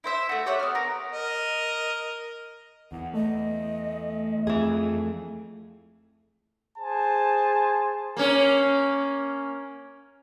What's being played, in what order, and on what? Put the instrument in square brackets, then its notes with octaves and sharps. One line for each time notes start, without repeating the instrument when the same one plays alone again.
[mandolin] E4 C5 E5
A3 F#4
G4 C#5 E5 F#5
B3 F6
A#4
[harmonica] A#4 D#5
[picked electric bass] E2 [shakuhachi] F#5
[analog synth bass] A3 [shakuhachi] D#5
[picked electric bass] F2 [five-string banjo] E3 G#4
[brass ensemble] G#4 C5 G#5 A5
[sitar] A#3 C#4